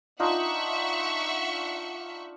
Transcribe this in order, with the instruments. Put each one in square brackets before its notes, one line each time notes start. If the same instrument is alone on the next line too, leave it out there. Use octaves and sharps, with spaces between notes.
[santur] D4 D#4 F4 [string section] E5 F#5 C#6